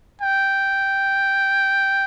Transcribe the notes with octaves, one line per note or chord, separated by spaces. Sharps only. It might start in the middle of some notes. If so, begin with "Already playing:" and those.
G5